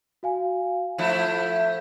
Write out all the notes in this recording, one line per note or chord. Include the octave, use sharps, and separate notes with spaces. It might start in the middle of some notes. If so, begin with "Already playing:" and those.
F#4 F5 G#5
F3 A3 E4
G6